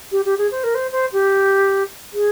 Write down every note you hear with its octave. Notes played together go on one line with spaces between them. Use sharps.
G4
G4
G#4
C5
A#4
C5
C5
G4
G#4